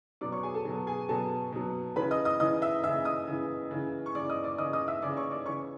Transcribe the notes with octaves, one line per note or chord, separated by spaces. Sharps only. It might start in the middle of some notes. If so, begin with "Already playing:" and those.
B2 F#3 D5 D6
C#5 C#6
G#4 G#5
A4 A5
B2 F#3
G#4 G#5
B2 F#3 A4 A5
B2 F#3
C#3 E3 B4 B5
D#5 D#6
D#5 D#6
C#3 E3 D#5 D#6
E5 E6
C#3 E3 E5 E6
D#5 D#6
C#3 E3
C#3 E3
C#6
C#3 E3 D5 D6
D#5 D#6
D5 D6
C#3 E3 D#5 D#6
D#5 D#6
E5 E6
C#3 E3 D5 D6
C#5 C#6
D5 D6
C#3 E3 C#5 C#6